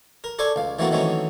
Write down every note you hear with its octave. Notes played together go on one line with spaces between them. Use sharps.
A#4
A4 C5 D5 G#5 C#6
C#2 F5
E3 F3 A3 A#3 C4 F#4
D#3 E3 F#3 A3 C4 C#4